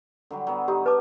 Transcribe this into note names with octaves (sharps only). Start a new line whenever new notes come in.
D3 F#3 G3
F#3 B3
D#4 G4
B4 A5 D6